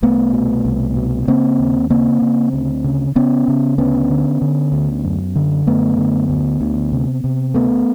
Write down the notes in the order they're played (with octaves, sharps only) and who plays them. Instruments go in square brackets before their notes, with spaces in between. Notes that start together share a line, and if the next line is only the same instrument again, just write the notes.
[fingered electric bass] C2 A3 B3
B2
C2
B2
C#3 A#3 C4
D#2
C#3 A#3 C4
C#3
D2
C#3
C#3 B3 C#4
C#3
D2 B3 C#4
D3
D3
D2
F#2
D3
F#2 A3 B3
D3
D2
D2
C3
C3
D2 A3 B3